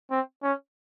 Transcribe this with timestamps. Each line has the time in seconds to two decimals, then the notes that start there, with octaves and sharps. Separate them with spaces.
0.11 C4
0.43 C#4